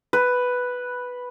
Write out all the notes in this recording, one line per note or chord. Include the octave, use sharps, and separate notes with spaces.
B4